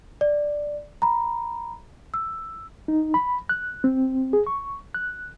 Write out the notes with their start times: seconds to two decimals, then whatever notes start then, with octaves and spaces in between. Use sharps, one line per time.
0.21 D5
1.02 A#5 B5
2.14 E6
2.88 D#4
3.14 B5
3.49 F#6
3.84 C4
4.33 G#4
4.47 C#6
4.94 F#6